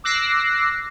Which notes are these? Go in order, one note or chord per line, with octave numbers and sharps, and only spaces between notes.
D6 E6 F#6 A#6 C7